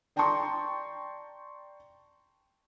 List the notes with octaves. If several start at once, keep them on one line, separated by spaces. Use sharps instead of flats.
D5 G5 A5 A#5 C6 C#6